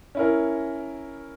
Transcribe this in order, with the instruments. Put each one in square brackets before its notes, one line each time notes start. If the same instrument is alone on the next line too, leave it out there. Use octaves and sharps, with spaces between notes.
[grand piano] C#4 E4 A#4